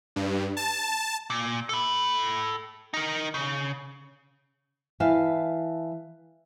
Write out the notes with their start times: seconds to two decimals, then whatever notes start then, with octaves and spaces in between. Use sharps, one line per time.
0.16 G2
0.57 A5
1.30 A#2
1.69 A4 B5
2.94 D#4 A#4
3.34 C#3
5.00 E3 E5 F5 A5